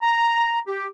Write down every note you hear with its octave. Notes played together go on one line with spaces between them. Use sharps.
A#5
G4